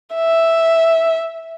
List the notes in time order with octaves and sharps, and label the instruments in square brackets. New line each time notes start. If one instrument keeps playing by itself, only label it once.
[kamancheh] E5